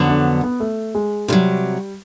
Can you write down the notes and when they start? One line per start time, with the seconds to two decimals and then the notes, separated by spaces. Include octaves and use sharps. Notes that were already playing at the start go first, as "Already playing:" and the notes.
Already playing: F2 D3 F#3 B3
0.09 D4
0.43 B3
0.60 A3
0.95 G#3
1.28 C3 D#3 G3
1.32 F#3